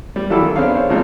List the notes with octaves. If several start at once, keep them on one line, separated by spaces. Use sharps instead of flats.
G3
E3 F#3 E4 F4 G4 A4
D#3
B3 C4 D4 G#4 C#5 F5
C5 C#5 F5
G#1 C#3 F3 G#3 D#4